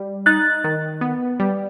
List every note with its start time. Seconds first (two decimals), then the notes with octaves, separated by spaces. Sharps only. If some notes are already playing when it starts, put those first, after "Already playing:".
Already playing: G3
0.26 D#4 F#6 A6
0.64 D#3
1.01 B3
1.40 G3